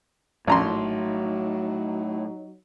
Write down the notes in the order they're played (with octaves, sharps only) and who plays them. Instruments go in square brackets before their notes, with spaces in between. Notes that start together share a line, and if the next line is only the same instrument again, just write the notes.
[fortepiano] A#1 A#5 C6 [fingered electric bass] A2 [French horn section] F#3 D#4